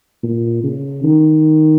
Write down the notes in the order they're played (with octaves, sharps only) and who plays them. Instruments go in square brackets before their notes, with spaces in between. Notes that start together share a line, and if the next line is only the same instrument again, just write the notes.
[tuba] A#2
C#3
D#3